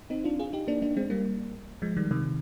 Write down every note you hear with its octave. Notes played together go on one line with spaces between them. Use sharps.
C4 D#4
D4 F4
F4 G#4
D#4 G4
A#3 D4
A#3 D4
G#3 C4
G3 A#3
F3 G#3
D#3 G3
C3 D#3